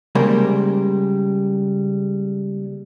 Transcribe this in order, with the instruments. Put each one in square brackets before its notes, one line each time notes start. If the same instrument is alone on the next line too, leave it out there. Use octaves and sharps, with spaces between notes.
[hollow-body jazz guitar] C#3 G3 G#3 A#3 A#4 C5